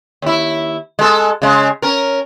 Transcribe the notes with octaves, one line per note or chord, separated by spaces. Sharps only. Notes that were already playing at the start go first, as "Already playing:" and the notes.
D#2 E4
G#3 A4
C#3 G#3
C#4 A#4